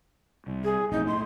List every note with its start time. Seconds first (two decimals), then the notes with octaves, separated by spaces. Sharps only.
0.47 C2
0.64 G#4
0.92 B1 F2 A2 D#4
1.07 A2 C6